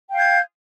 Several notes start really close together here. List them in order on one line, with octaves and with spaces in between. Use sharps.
G5 F5 G6 G#6